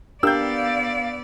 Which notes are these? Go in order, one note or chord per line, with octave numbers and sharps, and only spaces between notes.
B3 D4 G4 A#4 D5 F5 E6 G6